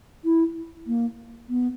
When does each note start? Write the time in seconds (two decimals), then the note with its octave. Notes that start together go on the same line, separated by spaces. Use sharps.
0.25 E4
0.87 A#3
1.49 B3